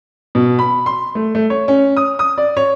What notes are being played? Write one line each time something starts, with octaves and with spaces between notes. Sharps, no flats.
B2
B5
C6
A3
A3
C#5
C#4
D#6
D#6
D5
C#5